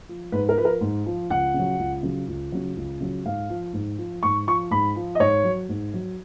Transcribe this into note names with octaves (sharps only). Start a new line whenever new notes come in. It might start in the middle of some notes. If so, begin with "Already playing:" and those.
F3
G#2 B4
A#4
F3 B4
A#4
G#2
F3
C#2 F#5
C#3
F#3
C#2
C#3 F#3
C#2
C#3 F#3
C#2
C#3 F#3
G#2 F5
F3
G#2
F3
G#2 C#6
F3 C#6
G#2 B5
F3
D#5
G#2 C#5
F#3
G#2
F#3